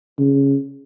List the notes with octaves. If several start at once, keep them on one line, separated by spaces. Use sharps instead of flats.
C#3